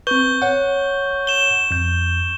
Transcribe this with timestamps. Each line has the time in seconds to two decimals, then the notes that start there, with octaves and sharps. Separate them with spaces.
0.07 C4 B4 C#6 G6 G7
0.42 C#5 F#5
1.27 E7 G7
1.71 F2 G6